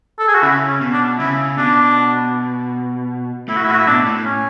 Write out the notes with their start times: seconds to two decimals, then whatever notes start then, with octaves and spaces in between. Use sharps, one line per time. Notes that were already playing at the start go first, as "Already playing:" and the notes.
0.19 A4
0.28 G#4
0.35 F#4
0.42 C#3 E4
0.68 C#4
0.81 B2
0.93 D4
1.19 C#3 E4
1.58 B2 D4
3.48 A2 E4
3.56 F#4
3.64 E4
3.68 A2 F#4
3.79 E4
3.87 B2 D4
4.06 A2
4.26 C#4